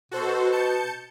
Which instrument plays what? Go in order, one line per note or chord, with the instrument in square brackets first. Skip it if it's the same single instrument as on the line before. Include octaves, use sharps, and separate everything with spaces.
[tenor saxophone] B2 [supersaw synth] F#4 A4 C5
[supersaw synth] A5 G6 C#7